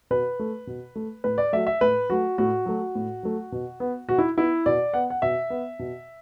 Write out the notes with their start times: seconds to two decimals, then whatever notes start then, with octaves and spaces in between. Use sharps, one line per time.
0.10 B2 B4
0.39 A3
0.67 B2
0.96 A3
1.24 A2 B4
1.38 D5
1.53 F#3 A3 E5
1.67 E5
1.81 A2 B4
2.10 F#3 A3 F#4
2.38 A2 F#4
2.66 F#3 A3
2.95 A2
3.23 F#3 A3
3.52 B2
3.80 B3
4.09 B2 F#4
4.18 E4
4.37 B3 E4
4.66 B2 D5
4.94 B3 F#5
5.10 F#5
5.22 B2 E5
5.50 B3
5.79 B2